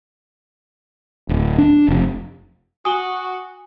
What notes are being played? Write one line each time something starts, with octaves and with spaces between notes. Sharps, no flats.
D1
D4
F1
F#4 G#5 D#6 G7